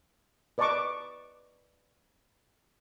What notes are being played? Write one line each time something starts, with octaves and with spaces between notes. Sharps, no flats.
B4 D5 D#5 A5 C#6 D6